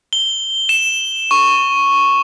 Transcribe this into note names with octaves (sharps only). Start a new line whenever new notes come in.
G7
E7
C#6